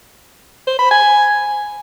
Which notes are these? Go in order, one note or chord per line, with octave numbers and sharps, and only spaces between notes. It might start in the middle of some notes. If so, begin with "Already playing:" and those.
C5
B5
G#5